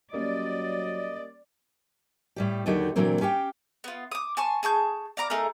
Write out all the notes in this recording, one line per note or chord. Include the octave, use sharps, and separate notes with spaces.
F#3 G3 A#3 C#4 D5 D#5
A2 G3 G4
D#2 D3 F#3 D#4 G4 F#5
A#2 D3 E3 F#3 A#3 C4
C#4 G4 F5 G5
B3 F4
D6 D#6
G#5 A5 C6 C#6
G#4 A5 C#6 G6
D5 F5 A#5 D6
A3 D#4 G#4 A#4